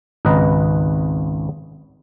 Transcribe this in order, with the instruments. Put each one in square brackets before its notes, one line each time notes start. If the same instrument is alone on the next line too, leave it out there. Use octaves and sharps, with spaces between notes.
[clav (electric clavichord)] G#1 C#2 B4 D#5 A#5